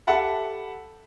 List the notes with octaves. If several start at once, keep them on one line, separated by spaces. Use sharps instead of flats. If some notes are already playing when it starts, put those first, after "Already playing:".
G4 A4 E5 F#5 A5 B5